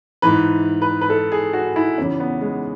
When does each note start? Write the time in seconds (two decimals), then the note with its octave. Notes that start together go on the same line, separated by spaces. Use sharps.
0.22 G#2 E3 B4
0.82 B4
1.01 B4
1.10 A4
1.32 G#4
1.53 F#4
1.76 E4
1.98 E2 C#3 E3 C#4
2.20 B3
2.41 G#3